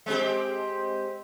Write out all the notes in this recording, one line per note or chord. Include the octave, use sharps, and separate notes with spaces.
G#3 C4 G4